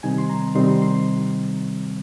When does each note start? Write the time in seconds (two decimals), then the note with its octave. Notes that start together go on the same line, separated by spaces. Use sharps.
0.03 C3 D#3 G3 C4 D#4 G#5
0.18 C6
0.30 A#5
0.55 C3 D#3 G3 C4 D#4 C6
0.82 C6